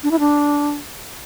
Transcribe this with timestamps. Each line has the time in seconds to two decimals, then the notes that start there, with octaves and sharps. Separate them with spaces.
0.03 D4
0.11 E4
0.19 D4